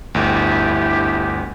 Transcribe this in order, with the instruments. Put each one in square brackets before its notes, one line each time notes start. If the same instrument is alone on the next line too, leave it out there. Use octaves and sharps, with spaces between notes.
[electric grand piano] G1 D2 [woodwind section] E4 G4